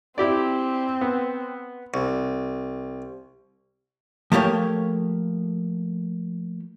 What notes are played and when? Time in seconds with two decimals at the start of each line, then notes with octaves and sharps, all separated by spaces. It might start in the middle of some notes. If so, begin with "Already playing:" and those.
0.18 C4 E4 G4 D5
1.01 B3
1.94 C2
4.32 F3 A3 A#3 G4 C#5